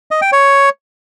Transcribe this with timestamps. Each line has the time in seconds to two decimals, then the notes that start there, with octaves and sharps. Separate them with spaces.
0.11 D#5
0.22 G5
0.32 C#5